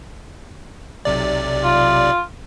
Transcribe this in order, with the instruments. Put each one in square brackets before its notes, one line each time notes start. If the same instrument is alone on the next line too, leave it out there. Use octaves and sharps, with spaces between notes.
[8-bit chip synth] B1 C3 D5
[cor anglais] F4